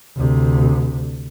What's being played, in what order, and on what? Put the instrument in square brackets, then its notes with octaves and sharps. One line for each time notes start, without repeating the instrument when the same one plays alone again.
[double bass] D2 C3